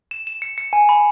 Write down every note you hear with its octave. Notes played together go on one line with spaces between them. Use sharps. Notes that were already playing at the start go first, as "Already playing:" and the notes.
E7
E7
C#7
C#7
G#5
B5